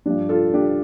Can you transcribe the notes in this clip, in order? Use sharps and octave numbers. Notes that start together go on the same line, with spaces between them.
G2 F3 D4 G4
F4 A4
D4 G4